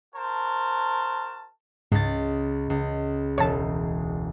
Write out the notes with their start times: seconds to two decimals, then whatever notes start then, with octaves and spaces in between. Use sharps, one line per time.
0.15 F#4 A#4 C5 A5
1.92 C#2 G#2 A6
2.70 C#2
3.38 E1 C#5 A5